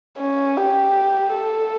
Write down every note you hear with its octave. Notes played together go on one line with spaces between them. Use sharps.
C#4
G4
A4